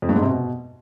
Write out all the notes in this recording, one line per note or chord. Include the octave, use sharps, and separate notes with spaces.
F2
G2
G#2
C3
B2